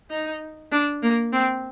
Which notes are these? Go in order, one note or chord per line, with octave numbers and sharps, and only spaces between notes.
D#4
D4
A#3
C4